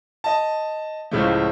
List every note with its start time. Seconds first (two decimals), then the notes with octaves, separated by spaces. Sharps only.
0.24 D#5 A5
1.11 C#2 A2 C#3 F3 G#3 A3